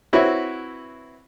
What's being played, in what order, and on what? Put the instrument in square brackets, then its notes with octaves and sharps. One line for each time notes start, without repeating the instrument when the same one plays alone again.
[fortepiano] C4 E4 F#4 B4 C#5